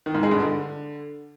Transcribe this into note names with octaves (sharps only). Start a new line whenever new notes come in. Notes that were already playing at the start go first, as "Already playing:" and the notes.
D#3
G#2
G#3
G2
D3